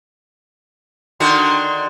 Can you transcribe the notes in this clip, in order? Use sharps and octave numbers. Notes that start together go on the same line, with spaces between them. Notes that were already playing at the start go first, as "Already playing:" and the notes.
D3 D#3 F#4 C6